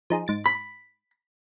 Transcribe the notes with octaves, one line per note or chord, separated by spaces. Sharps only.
F3 D#4 G#4
G#2 A6 D7
B5